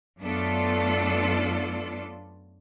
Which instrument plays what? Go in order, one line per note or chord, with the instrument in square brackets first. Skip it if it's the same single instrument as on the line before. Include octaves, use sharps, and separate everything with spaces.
[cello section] F#2 A3 B3 D4 F4 A4